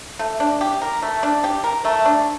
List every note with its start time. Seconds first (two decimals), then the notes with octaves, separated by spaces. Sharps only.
0.19 A3
0.40 D4
0.61 G4
0.82 A#4
1.02 A3
1.23 D4
1.44 G4
1.64 A#4
1.85 A3
2.06 D4